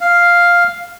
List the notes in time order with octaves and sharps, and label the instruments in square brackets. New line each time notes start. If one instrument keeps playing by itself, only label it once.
[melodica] F5